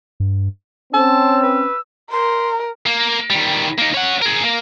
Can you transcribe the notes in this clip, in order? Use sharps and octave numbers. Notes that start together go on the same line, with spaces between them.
G2
C4 C#4 A5 E6
B4
A#4 C6
A#3
D#3 G3
A#3 D#4
C#4 F#5
G#4 A#4
A#3